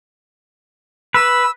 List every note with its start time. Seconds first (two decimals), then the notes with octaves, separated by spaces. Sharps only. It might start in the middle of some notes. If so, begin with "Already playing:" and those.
1.14 B4 E6